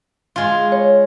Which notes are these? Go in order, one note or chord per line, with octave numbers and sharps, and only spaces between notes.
G#3 F4
C#5